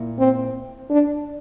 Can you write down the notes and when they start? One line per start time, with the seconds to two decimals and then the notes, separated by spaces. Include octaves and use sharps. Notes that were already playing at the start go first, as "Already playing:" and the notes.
Already playing: A#2 E4
0.19 C4
0.90 D4